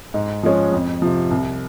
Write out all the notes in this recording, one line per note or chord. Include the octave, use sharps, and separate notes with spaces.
G#2
F3 G#3 C#4 G#4
F2
C3 F3
C2